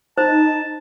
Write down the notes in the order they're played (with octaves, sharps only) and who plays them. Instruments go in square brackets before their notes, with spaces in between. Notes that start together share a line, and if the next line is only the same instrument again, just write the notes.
[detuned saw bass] D#4 [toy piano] C5 [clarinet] A5